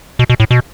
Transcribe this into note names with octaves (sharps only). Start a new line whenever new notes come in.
B2
B2
A2
B2